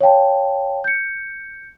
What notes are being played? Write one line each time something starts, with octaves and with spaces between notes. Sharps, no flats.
C#5 F5 G5 A5
G6 C#7